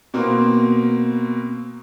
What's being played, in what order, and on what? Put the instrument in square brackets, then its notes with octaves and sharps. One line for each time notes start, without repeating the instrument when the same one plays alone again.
[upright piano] B2 A#3 C4